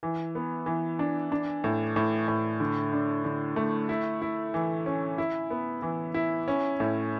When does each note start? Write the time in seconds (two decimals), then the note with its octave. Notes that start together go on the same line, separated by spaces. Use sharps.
0.03 E3
0.35 B3
0.66 E3
0.99 D4
1.32 D4
1.64 A2
1.96 A2
2.28 A2
2.60 D3
2.93 D4
3.24 D3
3.56 A3
3.89 E4
4.22 E4
4.54 E3
4.86 C#4
5.18 E4
5.50 B3
5.82 E3
6.14 E4
6.48 C#4
6.80 A2